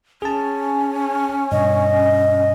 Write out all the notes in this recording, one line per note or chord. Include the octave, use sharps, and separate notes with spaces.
C#4 G#4 A5
G2 B2 D#5